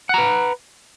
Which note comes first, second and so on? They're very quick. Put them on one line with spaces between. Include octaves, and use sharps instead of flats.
F#5 A#5 B4